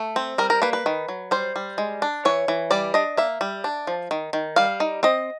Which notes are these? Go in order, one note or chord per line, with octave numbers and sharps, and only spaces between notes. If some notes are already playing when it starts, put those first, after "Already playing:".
Already playing: A3
C4
G3 A#4
A#4
A#3 B4
B4
D#3
F#3
G3 C5
G3
G#3
D4
E3 C#5
E3
G3 D5
D4 D#5
A#3 E5
G3
D4
F3
D#3
D#3
G3 F5
D#4
C4 D#5